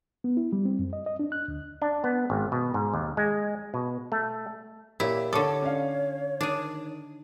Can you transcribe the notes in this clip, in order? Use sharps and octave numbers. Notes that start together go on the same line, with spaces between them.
B3
E4
G3
C4
F#2
D#5
D#5
D4
F#6
D2
D4
B3
G#1
B2
G#2
D#2
G#3
B2
A3
A#2 E4 G4 C#5
D3 A4 C#5 A5 C#6 D6
C#4 D5 F5
D#3 D4 G#4